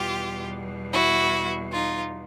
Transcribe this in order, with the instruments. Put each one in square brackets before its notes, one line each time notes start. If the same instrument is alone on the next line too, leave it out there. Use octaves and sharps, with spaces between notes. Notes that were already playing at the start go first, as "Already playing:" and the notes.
Already playing: [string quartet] E2 B2 G3 F4 G4
E4 F#4
D#4 F4